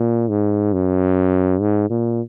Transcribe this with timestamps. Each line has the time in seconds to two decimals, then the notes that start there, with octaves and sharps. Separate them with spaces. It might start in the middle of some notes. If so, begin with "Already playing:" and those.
Already playing: A#2
0.29 G#2
0.73 F#2
1.61 G#2
1.90 A#2